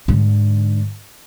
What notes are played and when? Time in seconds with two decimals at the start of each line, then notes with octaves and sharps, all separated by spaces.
0.08 G#2 D3